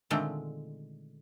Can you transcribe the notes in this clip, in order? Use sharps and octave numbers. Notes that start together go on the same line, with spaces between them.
A#2 D3 D#3 G#3 A3 C4